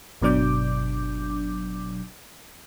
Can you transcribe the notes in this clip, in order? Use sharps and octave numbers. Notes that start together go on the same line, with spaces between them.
G1 B2 F#3 D4 D6 G6